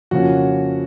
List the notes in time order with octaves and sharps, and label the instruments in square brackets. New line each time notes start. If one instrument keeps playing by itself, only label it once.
[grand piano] F2 C#3 F3 A#3 C#4 F#4